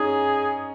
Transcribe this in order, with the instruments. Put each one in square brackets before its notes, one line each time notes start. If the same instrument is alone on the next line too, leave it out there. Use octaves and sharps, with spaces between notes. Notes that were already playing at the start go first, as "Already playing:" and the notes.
Already playing: [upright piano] C#4 D#4 [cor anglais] G#4